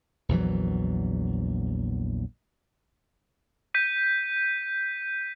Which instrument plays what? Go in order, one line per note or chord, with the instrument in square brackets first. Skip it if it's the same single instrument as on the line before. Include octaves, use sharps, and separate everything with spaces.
[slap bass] A#1 E2 E3 F#3
[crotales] G6 B6 D#7